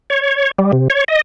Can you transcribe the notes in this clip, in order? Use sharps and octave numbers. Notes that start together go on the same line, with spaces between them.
C#5
G3
C3
C#5
D#5